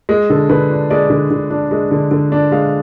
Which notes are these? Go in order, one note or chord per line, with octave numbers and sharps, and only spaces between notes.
G#3
D3 A4
D3 B4
D4
G#3 D5
D3
D3
D4
G#3
D3
D3
D4
G#3 F5